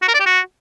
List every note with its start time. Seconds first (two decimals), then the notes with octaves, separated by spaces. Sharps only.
0.02 F#4
0.08 A#4
0.14 D5
0.20 G4
0.26 F#4